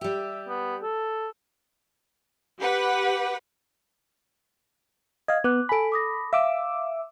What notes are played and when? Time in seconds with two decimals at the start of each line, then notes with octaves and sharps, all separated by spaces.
0.01 G3 G4 E5
0.48 B3
0.83 A4
2.58 G4 B4 F#5
5.28 D#5 F5 G#6
5.44 B3 D6 F#6
5.69 A4 G#5 B5 D7
5.92 D6 D#6 A#6
6.33 E5 F5 D6 E6